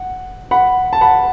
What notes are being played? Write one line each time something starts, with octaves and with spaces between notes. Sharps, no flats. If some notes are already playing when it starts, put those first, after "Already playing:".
Already playing: F#5
F#5 B5
A5
F#5 B5